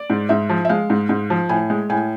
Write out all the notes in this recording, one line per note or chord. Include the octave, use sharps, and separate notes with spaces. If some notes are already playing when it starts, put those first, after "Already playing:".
Already playing: D5
G#2
G#2 E5
F3
E5
G#3 F5
G#2
G#2
F3
A2 G#5
G#3
A2 G#5